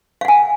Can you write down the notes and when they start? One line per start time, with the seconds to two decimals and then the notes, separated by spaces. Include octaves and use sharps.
0.21 F5
0.25 F#5
0.28 G#5